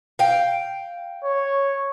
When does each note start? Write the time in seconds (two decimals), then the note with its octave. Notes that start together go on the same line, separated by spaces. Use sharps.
0.19 F5 G5
1.24 C#5